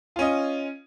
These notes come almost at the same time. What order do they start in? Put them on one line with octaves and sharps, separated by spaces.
F4 C#4 D#5